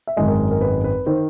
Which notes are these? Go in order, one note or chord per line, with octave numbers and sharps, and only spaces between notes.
E5
G#1 F#2 D#3 G#3 D#5
A#4
A#4
A#4
B4
B4
D#3 C5